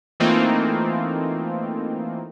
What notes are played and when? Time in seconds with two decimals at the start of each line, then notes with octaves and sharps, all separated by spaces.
0.20 E3 A3 A#3 C4 D#4 F4